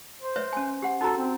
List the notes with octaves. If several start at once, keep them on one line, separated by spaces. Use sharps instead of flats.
C5
B4 C#5 E5
C#4 G#5
G4 F#5
D#4 F#4 A4 A#5
C4